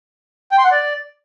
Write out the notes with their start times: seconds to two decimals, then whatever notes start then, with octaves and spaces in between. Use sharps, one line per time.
0.51 G5
0.58 C6
0.65 F#5
0.71 D5